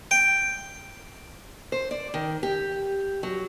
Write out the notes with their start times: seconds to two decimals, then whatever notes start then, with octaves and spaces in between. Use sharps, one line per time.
0.11 G5
1.72 C5
1.91 D5
2.14 D#3
2.43 G4
3.23 F#3